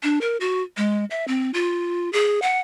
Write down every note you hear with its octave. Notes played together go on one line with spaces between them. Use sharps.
D4
A#4
F#4
G#3
E5
C4
F4
G#4
F#5